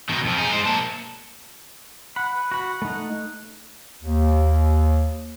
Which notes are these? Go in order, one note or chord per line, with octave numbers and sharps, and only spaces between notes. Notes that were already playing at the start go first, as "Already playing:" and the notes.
B2 D#3
F2 F3
D#4 G#4
G#3 C5
A#3 A5
F#5 B5
B4
F#4 F#5 B5
A3 D#4
D#2